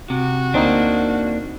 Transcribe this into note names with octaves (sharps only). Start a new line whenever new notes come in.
C3 F#4
D2 A#3 C4 D4 D#4